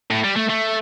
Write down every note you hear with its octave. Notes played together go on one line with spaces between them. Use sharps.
A2
G3
A3
A3